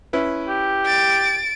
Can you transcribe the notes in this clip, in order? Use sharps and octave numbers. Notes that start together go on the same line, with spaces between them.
C#4 E4 B4
G4
A6 D7